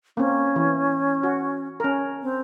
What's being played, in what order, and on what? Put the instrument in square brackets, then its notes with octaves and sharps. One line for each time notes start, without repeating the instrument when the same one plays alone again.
[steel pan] A#3 C4 [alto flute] C#4
[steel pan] E3
F#4
C#4 A#4
[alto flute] C4